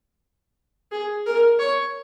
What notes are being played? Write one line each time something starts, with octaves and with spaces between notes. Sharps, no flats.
G#4
A#4
C#5